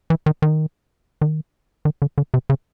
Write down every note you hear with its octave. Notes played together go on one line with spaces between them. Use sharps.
E3
D#3
D#3
D#3
D#3
D3
D3
C3
C#3